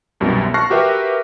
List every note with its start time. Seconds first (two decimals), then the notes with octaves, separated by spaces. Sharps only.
0.20 C2 F#2 B2 G3
0.54 A5 C#6 F6 F#6 A#6 C7
0.70 F#4 G4 A#4 B4 E5